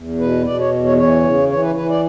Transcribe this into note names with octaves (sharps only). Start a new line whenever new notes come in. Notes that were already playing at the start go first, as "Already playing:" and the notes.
Already playing: E2
B2 B4
B2 D5
C#5
E2
C#5
E3 C#5
C#3
E3 C#5
B4
E3 B4
D5